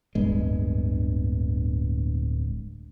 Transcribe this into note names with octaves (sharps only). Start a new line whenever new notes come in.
D1 G1 G2 G#3